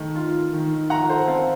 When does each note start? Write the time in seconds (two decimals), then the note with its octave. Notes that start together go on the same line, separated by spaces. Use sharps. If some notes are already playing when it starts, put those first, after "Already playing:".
Already playing: D#3 A3
0.16 F4
0.54 D#3
0.90 F4 F#5 A#5
1.09 A4 C5
1.28 C4 F5 A5